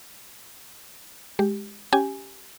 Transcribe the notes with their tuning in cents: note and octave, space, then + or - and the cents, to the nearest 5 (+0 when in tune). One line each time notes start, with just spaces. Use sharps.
G#3 +0 G4 +0
C#4 +0 G4 -5 G#5 +0